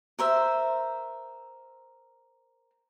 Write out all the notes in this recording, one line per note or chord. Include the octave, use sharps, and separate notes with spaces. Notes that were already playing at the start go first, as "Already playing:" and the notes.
A#4 C5 E5